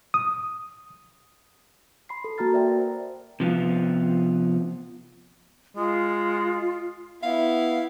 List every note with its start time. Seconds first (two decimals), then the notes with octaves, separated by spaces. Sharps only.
0.14 D#6
2.09 B5 C6 C7
2.24 A4
2.38 A#3 F#4 A5 A#5 F6 A6
2.53 A#4 D5 E5 G5
2.78 C5
3.40 C3 F3 B3 F4
5.77 G#3 F4
7.23 B3 E4 F5